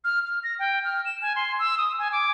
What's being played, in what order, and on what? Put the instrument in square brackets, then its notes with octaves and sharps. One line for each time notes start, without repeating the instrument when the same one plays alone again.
[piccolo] F6
F6
A#6
G5
F6
E7
G#5
C6
E6
D#6
G#5
D6